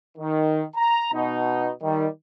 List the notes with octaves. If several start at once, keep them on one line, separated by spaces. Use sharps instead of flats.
D#3
A#5
B2 D#4
D#3 G3